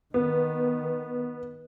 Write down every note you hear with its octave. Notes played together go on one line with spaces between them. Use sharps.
D#3 B3